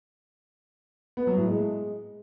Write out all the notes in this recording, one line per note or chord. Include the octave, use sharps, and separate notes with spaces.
B3
F#3
A2
G#3